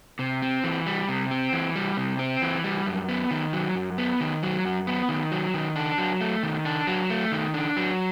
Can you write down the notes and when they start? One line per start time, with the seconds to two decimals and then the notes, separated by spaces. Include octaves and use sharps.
0.19 C3
0.42 C4
0.64 E3
0.86 G3
1.09 C3
1.31 C4
1.53 E3
1.76 G3
1.97 C3
2.19 C4
2.42 E3
2.64 G3
2.86 F#2
3.09 B3
3.31 D#3
3.53 F#3
3.75 F#2
3.98 B3
4.20 D#3
4.43 F#3
4.65 F#2
4.87 B3
5.09 D#3
5.32 F#3
5.54 D#3
5.76 D4
5.98 F#3
6.21 A3
6.43 D#3
6.65 D4
6.87 F#3
7.10 A3
7.32 D#3
7.54 D4
7.76 F#3